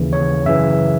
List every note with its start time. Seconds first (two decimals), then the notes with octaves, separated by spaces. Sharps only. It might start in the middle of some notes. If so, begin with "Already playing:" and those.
Already playing: D#2 C#3 E3
0.13 C#5
0.45 F#2 C#3 E3 E5